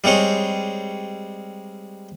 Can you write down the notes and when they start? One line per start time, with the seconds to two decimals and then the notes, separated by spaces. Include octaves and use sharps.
0.04 G3 G#3 C4 C#5 D#5